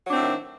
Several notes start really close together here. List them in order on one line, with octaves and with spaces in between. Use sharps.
F#3 D4 C4 A2 D#3